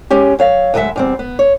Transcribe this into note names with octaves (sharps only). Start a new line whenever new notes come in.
G#3 C#4 G4
F#3 C#5 F5
D2 F#3 G#3 A4 E5 F#5
E2 G3 C4
B3
C#5